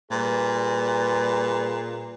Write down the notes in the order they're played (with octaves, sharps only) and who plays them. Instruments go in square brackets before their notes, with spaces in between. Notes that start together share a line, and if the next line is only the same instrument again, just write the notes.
[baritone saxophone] A#2 [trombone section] G3 G#4 B4